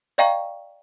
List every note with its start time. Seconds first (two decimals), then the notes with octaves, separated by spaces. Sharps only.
0.18 D5 D#5 F5 G5 A#5 C#6